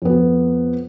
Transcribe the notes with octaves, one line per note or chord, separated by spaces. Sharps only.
F2 B3